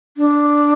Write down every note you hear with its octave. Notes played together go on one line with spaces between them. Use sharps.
D4